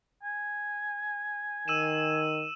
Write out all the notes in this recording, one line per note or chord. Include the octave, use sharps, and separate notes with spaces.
G#5
D#3 E6 D#7 E7